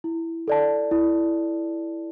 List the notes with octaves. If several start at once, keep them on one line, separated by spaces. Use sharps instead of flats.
E4
A4 D5 A5
E4